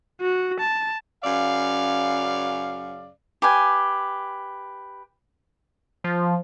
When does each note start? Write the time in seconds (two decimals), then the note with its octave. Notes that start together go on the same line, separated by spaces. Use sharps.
0.21 F#4
0.60 A5
1.23 F#2 C#3 D5 F5
3.42 G4 B4 G#5
6.04 F3